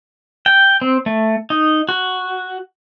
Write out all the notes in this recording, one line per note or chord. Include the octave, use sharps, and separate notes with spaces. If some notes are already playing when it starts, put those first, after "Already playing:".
G5
C4
A3
D#4
F#4